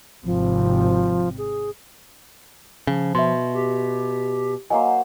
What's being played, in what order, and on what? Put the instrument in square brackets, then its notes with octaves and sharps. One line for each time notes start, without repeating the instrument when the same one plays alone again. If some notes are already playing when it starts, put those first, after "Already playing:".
[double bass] G#1 C3 [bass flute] F3
[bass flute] G#4
[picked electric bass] C#3 [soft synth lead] F3
[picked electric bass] B2 [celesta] E5 C6
[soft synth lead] G4
[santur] F#3 A#3 C5 [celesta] D#5 G#5